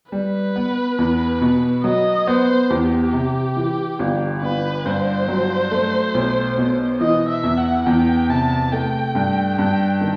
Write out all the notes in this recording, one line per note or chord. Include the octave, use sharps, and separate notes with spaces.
G3 B4
B3
E2
B2
F#3 D#5
B3 C5
E2 G4
C3
E3
G1
G1 B4
G2 C5
F#3
A3
B1
B2
E3 D#5
E5
E2
F#5
E2 G5
C3 A5
A3 G5
G2
G2 G5
D#3